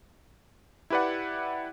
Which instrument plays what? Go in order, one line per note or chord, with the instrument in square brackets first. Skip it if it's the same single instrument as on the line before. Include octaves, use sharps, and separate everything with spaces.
[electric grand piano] E4 G4 B4 D5 F#5